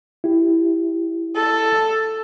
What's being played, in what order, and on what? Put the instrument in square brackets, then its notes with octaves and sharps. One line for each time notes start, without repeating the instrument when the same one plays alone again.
[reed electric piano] E4 G4
[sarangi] A4